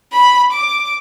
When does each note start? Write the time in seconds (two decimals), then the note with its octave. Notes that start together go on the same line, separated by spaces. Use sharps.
0.13 B5
0.53 D6